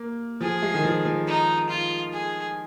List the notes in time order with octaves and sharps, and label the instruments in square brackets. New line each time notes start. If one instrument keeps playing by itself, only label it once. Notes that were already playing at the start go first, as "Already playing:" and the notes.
Already playing: [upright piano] A#3
[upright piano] F3 [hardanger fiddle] G#4
[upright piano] G#3
D#3
F3
F3
[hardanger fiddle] D#4
F4
G#4